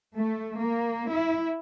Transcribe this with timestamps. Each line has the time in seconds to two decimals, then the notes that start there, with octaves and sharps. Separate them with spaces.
0.16 A3
0.59 A#3
1.10 E4